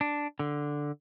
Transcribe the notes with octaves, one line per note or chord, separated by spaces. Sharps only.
D4
D3